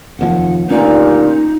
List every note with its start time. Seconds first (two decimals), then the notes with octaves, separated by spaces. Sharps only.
0.19 F1 D#2 F3 F#5
0.69 D2 G2 A#2 C#4 D#4